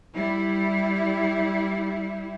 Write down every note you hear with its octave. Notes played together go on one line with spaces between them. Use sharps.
G3 E4